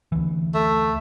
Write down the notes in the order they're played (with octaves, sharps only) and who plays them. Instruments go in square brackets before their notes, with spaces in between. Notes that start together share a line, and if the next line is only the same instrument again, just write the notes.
[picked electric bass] D2 E3
[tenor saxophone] A3